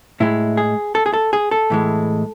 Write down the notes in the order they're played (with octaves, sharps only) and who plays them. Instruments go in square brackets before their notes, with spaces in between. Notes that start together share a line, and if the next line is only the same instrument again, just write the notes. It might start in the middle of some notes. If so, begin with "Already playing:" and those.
[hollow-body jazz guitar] A2 G#3 E4
G#4
A4
G#4
A4
G#4
A4
A2 E3 G#3